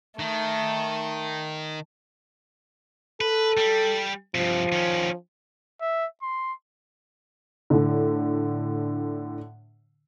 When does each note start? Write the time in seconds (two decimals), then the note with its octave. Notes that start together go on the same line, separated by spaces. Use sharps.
0.19 D#3 A3
3.21 A4 B4
3.57 G3
4.35 G2 C3 F3
4.72 D#3 C#4
5.81 E5
6.22 C6
7.70 A2 D3